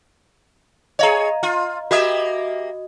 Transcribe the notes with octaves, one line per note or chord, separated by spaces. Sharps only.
G#4 C#5 D#5 F5 A#5
F4
A#3 F#4 G4 D#5 E5 D#6